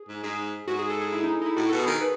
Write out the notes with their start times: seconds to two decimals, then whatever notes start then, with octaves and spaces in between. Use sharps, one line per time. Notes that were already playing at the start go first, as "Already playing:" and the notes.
Already playing: G#4
0.08 G#2
0.23 G#2 G#4
0.68 G#2 F#4
0.79 G#4
0.90 A4
1.01 G#4
1.12 E4
1.24 D#4
1.42 D#4
1.46 E4
1.56 A2 F#4
1.69 B2 A4
1.79 G#4
1.87 D#3
2.01 B4